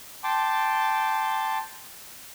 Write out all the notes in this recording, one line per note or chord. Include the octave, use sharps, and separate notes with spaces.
G5 A5 C6 D6